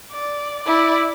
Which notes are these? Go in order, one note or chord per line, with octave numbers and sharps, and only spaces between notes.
D5
E4 D5